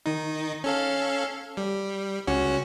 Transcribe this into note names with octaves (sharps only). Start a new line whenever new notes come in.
D#3 D#4
C#4 A4 F5
G3
C#2 C#4 F#4